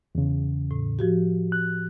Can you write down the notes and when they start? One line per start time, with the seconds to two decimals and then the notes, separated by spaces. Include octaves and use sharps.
0.15 E2 C#3
0.71 A2
0.99 F3 F#4 G4
1.52 F#6